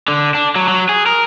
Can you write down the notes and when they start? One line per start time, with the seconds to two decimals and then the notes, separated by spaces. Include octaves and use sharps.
0.08 D3
0.35 D4
0.56 F#3
0.68 F#3
0.89 G#4
1.06 A#4